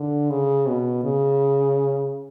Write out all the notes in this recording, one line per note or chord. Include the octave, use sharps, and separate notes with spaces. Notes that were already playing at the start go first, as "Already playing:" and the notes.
Already playing: D3
C#3
B2
C#3